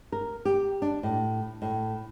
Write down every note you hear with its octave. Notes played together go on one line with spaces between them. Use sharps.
A#4
G4
D4
A2
A2